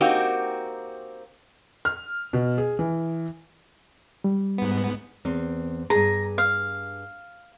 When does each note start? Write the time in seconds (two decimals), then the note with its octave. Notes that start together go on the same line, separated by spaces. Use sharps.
0.01 A#3 C4 D#4 F#4 G4
1.85 F6
2.33 B2
2.58 G#4
2.79 E3
4.24 G3
4.58 G#2 B3
5.25 E2 C4
5.90 G2 G#4 A#5
6.38 F5